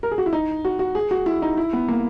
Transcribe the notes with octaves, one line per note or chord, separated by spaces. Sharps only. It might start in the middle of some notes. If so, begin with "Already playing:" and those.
A#4
G#4
F#4
E4
D#4
F#4
F#4
G#4
F#4
E4
D#4
E4
B3
A#3